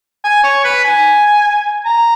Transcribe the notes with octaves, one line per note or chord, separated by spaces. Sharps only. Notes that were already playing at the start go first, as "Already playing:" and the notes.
G#5
C#5
B4
G#5
A#5